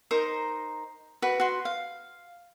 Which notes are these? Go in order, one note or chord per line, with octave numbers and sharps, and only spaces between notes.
D#4 A#4 C5 A#5
F#4 B4
F#4 C6
F5